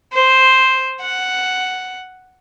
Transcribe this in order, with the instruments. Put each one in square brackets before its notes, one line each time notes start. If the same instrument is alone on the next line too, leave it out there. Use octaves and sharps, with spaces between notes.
[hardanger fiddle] C5
F#5